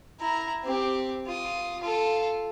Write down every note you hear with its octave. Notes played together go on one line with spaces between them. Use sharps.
E4 A#5
C4 G4
F4 D#6
F4 A4